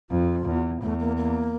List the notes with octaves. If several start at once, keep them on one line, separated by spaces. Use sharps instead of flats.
F2 F4
E2
E2 A3
A#3
A#3